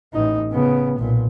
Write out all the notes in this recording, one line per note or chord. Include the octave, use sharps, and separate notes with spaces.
A1 D#4
C#3 B3
B1 A#2